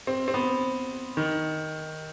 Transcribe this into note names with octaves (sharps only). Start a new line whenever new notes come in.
C4
C4
B3
D#3